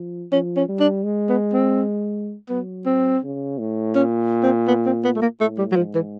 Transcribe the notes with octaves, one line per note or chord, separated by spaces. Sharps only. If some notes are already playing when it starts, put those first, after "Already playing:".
Already playing: F3
F3 C#4
C#4
G3
D4
G#3
B3
C4
F#3 B3
C4
C#3
A2
A#2 C#4
C4
B3
C4
B3
A3
A#3
A2 A3
G3
F#3
G#2 F3
E3